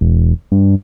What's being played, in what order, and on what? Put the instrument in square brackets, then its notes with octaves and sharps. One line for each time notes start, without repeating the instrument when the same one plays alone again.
[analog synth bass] E1
G2